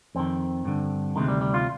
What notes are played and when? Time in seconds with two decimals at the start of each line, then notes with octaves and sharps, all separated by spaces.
0.15 F2 D#3 C4
0.65 G2 D3
1.16 D2 C3 D#3 G#3
1.28 G3
1.41 G3
1.54 F4